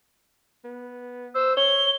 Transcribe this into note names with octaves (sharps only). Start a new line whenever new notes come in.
B3
C5 E6
C#5 G7